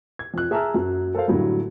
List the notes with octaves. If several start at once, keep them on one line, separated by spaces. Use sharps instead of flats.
G#6
F2 F#6
G#4 E5 A5 A#5 E6 F6
F#2 F#3
A4 A#4 C5 F5
A2 D3 F#3 G3